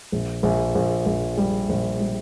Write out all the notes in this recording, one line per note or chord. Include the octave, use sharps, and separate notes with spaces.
A#1
A#1
A#1
A#1
G3
A#1
G3